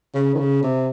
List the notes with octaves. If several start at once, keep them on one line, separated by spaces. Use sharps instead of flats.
C#3
D#3
C#3
C3